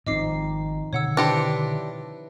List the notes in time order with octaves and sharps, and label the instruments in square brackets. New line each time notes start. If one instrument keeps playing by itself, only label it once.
[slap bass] G#1 G#2 [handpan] F3 C4 D#4 [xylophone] D#5 D6 C7
[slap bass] B2 D3 D#3 [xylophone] C#5 F#5 E6
[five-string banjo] D4 G4 C5 [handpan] E4 B4 [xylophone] A#6 C#7